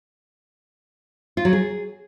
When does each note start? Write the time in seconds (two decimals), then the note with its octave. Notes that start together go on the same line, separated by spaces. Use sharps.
1.37 F4
1.45 F#3
1.53 G#4